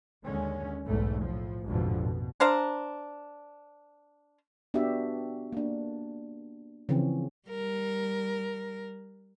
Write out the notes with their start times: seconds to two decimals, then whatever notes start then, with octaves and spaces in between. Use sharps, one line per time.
0.24 D#2 D3 G#3 C#4
0.86 B1 E2 G#2 A3
1.22 A2 F3
1.65 A1 F2 G#2 B2 D3 F3
1.99 B2
2.40 D4 C5 F5 A#5
4.74 B3 D4 F#4 G4 E5
5.53 A#3 D4
6.89 C#3 E3 F3 C4 C#4
7.48 G3 A#4